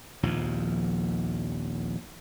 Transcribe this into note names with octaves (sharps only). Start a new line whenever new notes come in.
A#1 D#2 F3